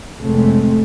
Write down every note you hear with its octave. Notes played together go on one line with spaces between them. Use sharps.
F1 A2 C#3 G#3 A3 C4